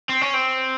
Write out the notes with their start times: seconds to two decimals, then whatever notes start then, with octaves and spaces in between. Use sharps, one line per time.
0.09 C4
0.21 C#4
0.34 C4